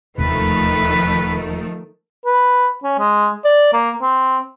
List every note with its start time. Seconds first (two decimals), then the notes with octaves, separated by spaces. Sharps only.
0.18 E1 D#2 C3 D#3 F3 A3 B4
2.25 B4
2.83 C#4
2.99 G#3
3.45 D5
3.73 A#3
4.02 C4